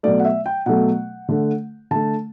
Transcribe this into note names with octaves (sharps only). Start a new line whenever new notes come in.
B2 F#3 A3 D5
F#5
E5
G5
B2 F#3 A3 F#5
D3 A3
D3 A3 A5